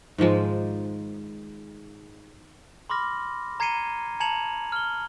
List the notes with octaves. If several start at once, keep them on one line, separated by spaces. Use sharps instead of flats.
G#2 D#3 F3 G#3
B5 C6 D6 F6 A#6
A#5 G#6 C7 C#7 D#7 G7
A5 A#5 G#6 C#7 F7 F#7
F6 G7